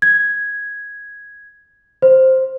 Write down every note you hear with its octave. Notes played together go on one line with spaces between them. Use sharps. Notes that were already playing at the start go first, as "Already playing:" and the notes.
G#6
C5